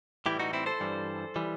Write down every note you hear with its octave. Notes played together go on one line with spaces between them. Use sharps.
A2 E3 G3 E4 G4
D#4 F#4
C4 E4
A4 C5
G2 E3 G3
E3 G3